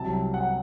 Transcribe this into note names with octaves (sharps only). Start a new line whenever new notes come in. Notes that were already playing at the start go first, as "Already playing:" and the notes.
Already playing: C2 C3 F#3 A5
F#5